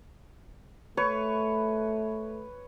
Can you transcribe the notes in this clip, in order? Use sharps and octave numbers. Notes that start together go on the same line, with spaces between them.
A3 B4 C#5 C#6